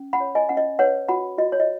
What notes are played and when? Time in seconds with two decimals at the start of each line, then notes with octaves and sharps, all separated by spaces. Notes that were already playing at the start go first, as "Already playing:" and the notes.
Already playing: C#4
0.13 F#5 B5
0.20 C#5
0.35 D#5 G#5
0.49 C#4 F#5
0.57 D#5
0.79 B4 C#5 F#5
1.08 F#4 F#5 B5
1.38 F#4 D#5
1.52 C#5
1.60 D#5